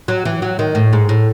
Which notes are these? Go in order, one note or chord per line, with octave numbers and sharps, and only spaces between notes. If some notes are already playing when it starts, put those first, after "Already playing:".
F#3
E3
F#3
D#3
A2
G#2
A2